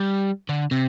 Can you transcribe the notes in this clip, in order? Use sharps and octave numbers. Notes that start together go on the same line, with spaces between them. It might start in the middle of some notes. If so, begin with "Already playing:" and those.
Already playing: G3
D3
C3